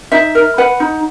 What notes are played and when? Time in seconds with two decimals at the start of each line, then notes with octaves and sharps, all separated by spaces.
0.12 D#4 E5
0.35 A#4
0.58 B4 F#5
0.80 D#4